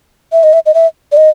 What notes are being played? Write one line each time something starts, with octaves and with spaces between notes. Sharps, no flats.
E5
D#5
E5
D#5
E5
D5
D#5